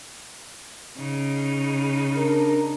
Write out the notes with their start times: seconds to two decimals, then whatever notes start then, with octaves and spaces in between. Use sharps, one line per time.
0.97 C#3 D#4
2.17 D4 A#4